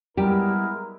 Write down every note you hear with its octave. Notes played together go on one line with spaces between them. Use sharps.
G3 G#3 B3 E4 G4 A#4